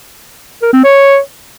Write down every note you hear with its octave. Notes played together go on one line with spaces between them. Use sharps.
A#4
C4
C#5